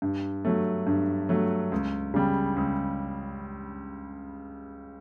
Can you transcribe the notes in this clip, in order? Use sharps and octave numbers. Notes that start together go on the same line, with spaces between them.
G2
F#3 A3
G2
F#3 A3
C#2
C#3 G3
C#2